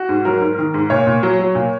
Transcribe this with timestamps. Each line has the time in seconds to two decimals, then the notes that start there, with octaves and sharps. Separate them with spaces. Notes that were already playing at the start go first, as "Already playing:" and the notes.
Already playing: F#4
0.09 G#2
0.25 F#3 A#4
0.41 G#2
0.58 D#3
0.74 G#2
0.90 A#2 C#5
1.07 A#2
1.23 F#3
1.39 F#3
1.55 A#2